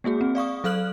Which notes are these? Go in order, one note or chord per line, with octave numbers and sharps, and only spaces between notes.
G#3 A#3 F#4 G#4
C4
D5 F5 C#6 D#6
F#3 A4 F5 F6 F#6 F#7